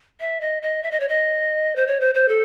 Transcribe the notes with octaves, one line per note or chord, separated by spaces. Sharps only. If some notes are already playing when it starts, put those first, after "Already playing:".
E5
D#5
D#5
E5
D#5
C#5
D#5
C5
C#5
C5
C5
A4